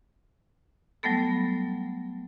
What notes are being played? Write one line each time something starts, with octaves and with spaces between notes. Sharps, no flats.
F#3 G3 A3 B3 A4